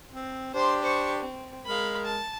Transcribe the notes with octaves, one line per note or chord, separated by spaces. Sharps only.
C4
D4 G4 C5 C6
C5 C#6
C4
G#3 A#4 F5 B5
A5